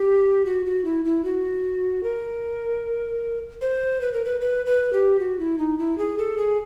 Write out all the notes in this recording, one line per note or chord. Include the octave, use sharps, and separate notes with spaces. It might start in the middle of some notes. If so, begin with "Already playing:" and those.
Already playing: G4
F#4
F#4
E4
E4
F#4
A#4
C5
B4
A#4
B4
B4
B4
G4
F#4
E4
D#4
E4
G#4
A4
G#4